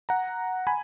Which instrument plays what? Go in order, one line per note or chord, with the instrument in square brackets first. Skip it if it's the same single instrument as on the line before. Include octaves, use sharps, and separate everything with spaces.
[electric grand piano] F#5 A#5
G#5 B5